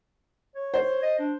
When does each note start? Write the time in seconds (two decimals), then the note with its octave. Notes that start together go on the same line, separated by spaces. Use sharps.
0.55 C#5
0.74 C5
1.03 D#5
1.19 D4